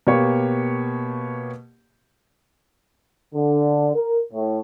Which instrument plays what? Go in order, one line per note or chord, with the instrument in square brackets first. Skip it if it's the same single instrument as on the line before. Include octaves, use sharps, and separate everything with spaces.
[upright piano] B2 A#3 G4 C#5
[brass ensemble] D3
A#4
A2